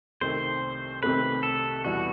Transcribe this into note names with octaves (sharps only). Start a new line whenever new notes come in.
C2 C3 D#3 A3 C4 C5
C2 C3 D#3 A3 C4 B4
A4
E2 B2 G3 B3 E4 F#4